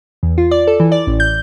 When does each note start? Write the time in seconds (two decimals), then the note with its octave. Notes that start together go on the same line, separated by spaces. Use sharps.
0.23 E2
0.38 F4
0.51 D5
0.67 A4
0.80 E3
0.92 D5
1.07 A1
1.20 G6